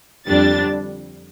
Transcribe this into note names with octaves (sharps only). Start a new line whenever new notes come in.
F2 D3 G3 D4 A6